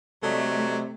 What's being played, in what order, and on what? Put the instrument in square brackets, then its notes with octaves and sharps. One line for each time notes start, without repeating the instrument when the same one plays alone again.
[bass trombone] C3 [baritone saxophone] F#3 [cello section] A3 [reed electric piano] A4 D5 D#5